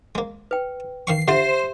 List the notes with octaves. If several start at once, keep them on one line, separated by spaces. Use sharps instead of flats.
G#3 A#3
B4 G5
D#3 F5 C#6 C7
D3 F4 G4 C5 E5